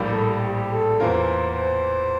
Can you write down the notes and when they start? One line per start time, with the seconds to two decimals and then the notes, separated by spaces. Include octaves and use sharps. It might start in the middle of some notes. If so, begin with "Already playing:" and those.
Already playing: A#1 A2 G3 A#3
0.11 A4
0.29 G4
0.46 G4
0.72 A4
1.00 E2 E3 A#3 F4 A#4 C5
1.53 C5